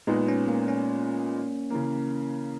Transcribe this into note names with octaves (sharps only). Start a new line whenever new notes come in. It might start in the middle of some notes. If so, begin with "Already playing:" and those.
A#2 G#3 B3 D#4
C#4
A#3
C#4
C#3 E3 A#3